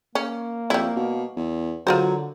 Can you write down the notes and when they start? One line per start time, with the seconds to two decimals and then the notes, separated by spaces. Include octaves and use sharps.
0.15 A#3 C#4
0.70 F2 G3 E4
0.96 B2
1.36 E2
1.87 D3 F#3 F4 A#4 C5